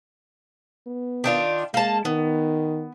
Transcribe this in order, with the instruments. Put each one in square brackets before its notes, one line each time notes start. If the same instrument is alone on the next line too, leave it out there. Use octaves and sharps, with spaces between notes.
[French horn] B3
[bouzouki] D#3 D4 F4
[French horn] G#3 [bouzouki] A#3 A5
[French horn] D#3 [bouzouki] B3